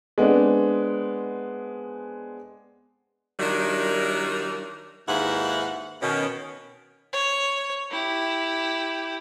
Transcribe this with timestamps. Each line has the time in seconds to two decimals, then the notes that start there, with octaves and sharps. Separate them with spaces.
0.18 G#3 B3 C4 D4
3.39 D#3 F#3 G3 D4 E4 A#4
5.08 D#2 G#2 E4 B4 F5 F#5
6.02 B2 D#3 C#4
7.13 C#5
7.91 E4 G4